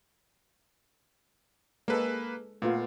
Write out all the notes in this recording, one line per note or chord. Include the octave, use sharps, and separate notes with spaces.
G#3 A#3 A4 B4
A#2 A3 B3 F4